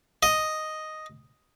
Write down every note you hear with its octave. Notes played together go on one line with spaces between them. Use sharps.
D#5